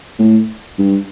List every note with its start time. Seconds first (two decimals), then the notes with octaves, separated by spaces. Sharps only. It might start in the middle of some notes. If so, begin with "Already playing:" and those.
0.19 A2
0.78 G2